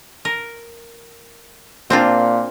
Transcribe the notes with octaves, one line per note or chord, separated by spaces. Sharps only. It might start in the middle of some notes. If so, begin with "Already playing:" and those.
A#4
A#2 C4 D4 F4